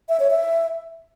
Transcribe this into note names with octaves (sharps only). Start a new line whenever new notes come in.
E5
C#5
E5